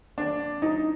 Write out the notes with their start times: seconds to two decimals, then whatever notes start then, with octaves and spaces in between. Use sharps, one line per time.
0.18 D4
0.62 D#4